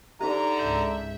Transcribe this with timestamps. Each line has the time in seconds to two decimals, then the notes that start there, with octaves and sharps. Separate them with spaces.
0.21 D3 D#4 G4 A#5
0.58 C#2 G#2 E5 E6 G6 F#7